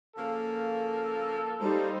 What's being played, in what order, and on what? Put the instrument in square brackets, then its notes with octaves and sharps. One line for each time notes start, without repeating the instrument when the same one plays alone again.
[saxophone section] C#3 F3 A#3 [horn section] A4
[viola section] G3 D#4 C5 [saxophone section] A#3 F4